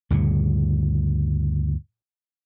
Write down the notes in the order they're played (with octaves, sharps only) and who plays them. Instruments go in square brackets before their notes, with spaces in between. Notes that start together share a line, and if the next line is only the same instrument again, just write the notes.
[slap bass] D2 G2 A#2 C#3